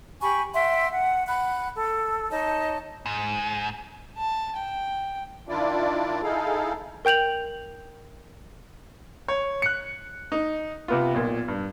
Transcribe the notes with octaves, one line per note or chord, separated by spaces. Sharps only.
G4 G#5 B5 C#6
E5 F#5 G5 C6
F#5
F#5 B5 F#6
A4
D#4 C#5 D#5 A5
G#2
A5
G5
D#3 D4 E4 F4 D5
D#4 E4 G#4 A4 F5
A#4 G5 G6 F7 F#7
C#5
F#6 C#7
D#4
C3 B3 F4
B1 A#2
G2